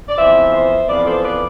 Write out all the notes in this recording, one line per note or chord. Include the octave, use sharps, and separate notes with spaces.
D5
F2 E3 B3 F4 C5 E5
C5 E5
F2 E3 B3 F4 B4 D5
A4 C5
B4 D5